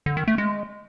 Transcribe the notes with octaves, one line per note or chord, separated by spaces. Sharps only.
D3
D#3
A3
G#3